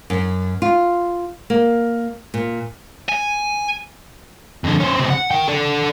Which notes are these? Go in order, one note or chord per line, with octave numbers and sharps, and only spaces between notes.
F#2
F4
A#3
A#2
G#5
F2 D3
C#4 C5
C#3 C4
F#5
A#4 G5
A4 D5